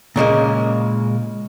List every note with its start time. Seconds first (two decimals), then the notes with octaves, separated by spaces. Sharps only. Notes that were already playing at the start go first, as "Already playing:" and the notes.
0.16 A#2 C#3 G#3 A#3